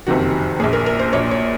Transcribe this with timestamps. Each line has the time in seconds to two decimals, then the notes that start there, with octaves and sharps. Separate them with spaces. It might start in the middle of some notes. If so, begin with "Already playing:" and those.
0.07 F#1 F2 C3 D#3 F#4
0.60 A#2 G#4
0.64 A#1
0.73 A#4
0.86 A#4
0.99 C5
1.13 A#1 A#2 C#5
1.31 C#5